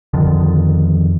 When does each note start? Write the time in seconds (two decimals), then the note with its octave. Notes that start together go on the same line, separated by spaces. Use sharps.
0.13 F2 D3 D#3 F3